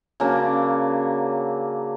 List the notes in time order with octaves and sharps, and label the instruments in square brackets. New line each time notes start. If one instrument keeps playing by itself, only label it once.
[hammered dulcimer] C#3 F#3 A#3 D4